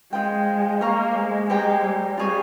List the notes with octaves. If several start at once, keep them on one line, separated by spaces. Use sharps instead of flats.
G#3 F4 G#4 C5 G5
A#3 C5 F5 A#5 C#6
G#3
G#3 G4 C5 G5 A#5
G3
F4 G#4 C#5 G#5